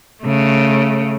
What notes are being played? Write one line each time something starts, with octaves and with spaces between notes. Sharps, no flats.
C#3 A3